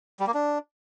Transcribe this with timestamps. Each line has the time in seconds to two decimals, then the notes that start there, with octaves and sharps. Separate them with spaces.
0.20 G3
0.27 A#3
0.34 D4